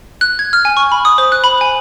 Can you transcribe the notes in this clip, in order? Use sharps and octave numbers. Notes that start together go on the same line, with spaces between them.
F#6
G#6
F6
G#5
C#6
B5
D#6
C5
F#6
B5
G#5